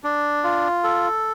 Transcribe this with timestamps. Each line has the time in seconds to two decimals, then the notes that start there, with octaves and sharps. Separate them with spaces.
0.04 D4
0.44 F4
0.84 A4